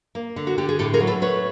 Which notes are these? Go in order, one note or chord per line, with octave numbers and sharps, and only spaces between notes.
A#3
D3
F#4
D3 G4
G#4
A2 G4 A4
G#4 A#4
F#3
A4 B4
A3 B4 C#5